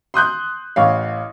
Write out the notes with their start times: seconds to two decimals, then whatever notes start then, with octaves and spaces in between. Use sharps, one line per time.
0.14 C6 D#6 F#6 G6
0.76 A1 C#5 F5